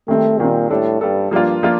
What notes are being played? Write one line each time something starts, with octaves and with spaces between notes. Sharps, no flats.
D#3 G3 A3 C4
A#2 D#3 G3 C4
A2 G3 D4 A4
G2 G3 D4 A4
G2 F3 A#3 D4 F4
F3 A#3 D4 F4